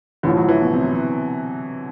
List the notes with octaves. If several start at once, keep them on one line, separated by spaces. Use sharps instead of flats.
A1 A2 D3 F3
F#3
E3
B2
C3